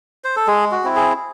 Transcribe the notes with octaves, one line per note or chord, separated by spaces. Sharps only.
C5
A4
G#3 G#4
F#4
C4 E4
G#4